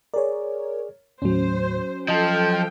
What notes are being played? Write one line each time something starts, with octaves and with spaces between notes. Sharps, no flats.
G#4 A#4 C#5 D5
D#2 A2 F#3 C#4 C5
F3 A4 D#5 G5 A5